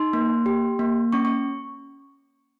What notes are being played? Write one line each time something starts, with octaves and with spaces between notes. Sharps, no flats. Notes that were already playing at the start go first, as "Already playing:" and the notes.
Already playing: D#4 C6
A#3
G4
A#3
C#4 C#6
C#6